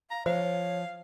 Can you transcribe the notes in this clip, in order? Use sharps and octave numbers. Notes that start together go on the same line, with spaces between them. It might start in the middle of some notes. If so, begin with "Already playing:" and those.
F5 A#5
F3 C5 C#5 F5